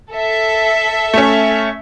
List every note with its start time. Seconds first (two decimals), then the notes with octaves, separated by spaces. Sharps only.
0.11 A4 E5
1.14 A3 C#4